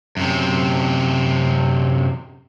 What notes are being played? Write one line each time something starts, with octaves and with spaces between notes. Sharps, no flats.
F#2 C3